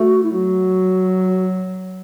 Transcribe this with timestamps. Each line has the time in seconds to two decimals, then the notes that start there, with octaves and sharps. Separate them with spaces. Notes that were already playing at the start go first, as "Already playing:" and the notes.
Already playing: A3 F#4
0.23 E4
0.32 F#3 F#4